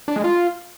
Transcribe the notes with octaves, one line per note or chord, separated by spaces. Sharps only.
D4
G#3
F4